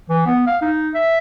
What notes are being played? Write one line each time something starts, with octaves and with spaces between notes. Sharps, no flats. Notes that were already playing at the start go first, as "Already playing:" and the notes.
E3
B3
F5
D#4
E5